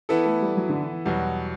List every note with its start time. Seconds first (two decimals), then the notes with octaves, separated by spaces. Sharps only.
0.09 E3 B3 E4 A4
0.25 A3
0.42 G3
0.57 F#3
0.69 D3
0.81 E3
0.93 E3
1.05 E2 B2 F#3 G3